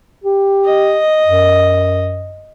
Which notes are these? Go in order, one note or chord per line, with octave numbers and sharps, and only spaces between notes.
G4
D#5
F#2